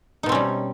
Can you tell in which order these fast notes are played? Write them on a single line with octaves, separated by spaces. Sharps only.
D#4 B2 C4 C#4 G3